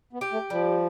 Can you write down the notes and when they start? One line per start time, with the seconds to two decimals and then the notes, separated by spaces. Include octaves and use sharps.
0.13 B3
0.21 G4
0.32 A3
0.50 F3 G3